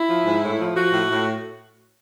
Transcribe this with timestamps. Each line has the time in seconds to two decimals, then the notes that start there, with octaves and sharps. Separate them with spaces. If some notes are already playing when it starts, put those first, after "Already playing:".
Already playing: E4
0.09 F3
0.26 G#2
0.42 A2
0.60 F3
0.76 F3 F#4
0.93 A2
1.09 A2